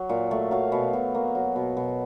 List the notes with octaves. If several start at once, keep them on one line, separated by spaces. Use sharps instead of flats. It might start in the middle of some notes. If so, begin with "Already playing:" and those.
Already playing: F#3
A#2
A3
F#3 F5
B2
B2
A#3
F#3
B2
B2